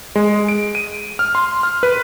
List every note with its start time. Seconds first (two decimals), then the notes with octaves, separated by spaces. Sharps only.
0.16 G#3
0.48 D7
0.75 D#7
1.19 F6
1.35 C6
1.63 F6
1.83 B4